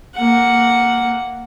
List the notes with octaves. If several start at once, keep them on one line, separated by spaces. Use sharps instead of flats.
A#3 F#5